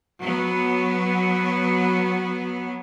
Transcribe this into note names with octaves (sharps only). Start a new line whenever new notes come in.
F#3 B3